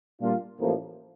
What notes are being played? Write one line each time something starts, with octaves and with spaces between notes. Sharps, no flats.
A#2 G3 A#3 D4 F4
A1 A2 F3 A#3